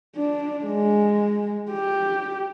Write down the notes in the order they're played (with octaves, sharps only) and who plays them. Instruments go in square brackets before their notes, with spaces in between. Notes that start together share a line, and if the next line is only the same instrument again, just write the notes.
[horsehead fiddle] D4
G#3
G4